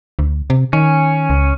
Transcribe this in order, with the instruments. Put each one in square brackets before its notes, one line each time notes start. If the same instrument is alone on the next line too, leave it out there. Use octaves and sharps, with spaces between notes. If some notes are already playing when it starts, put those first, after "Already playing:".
[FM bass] D2
C3
[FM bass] D#3 [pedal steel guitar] C#4
[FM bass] C#2